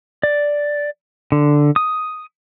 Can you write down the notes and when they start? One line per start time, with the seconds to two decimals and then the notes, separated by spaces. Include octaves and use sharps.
0.23 D5
1.32 D3
1.76 D#6